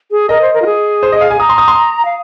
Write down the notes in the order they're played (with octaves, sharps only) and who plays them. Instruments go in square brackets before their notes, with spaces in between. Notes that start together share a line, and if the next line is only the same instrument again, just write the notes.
[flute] G#4
[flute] A#4 [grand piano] D#5
[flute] C5
A#4
F4
G#4
[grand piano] C5
D#5
F5
G#5
[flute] A#5 [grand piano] D#6
[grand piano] C6
D#6
C6
[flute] F5